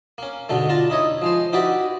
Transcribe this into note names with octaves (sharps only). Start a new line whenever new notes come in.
A#3 C#4
G#2 B2 D3 A3
D4 F4 A5 A#5
D#4 E4 C#5 D#5
F3 G#3 C5
D#4 E4 F#4 G4 B4 D5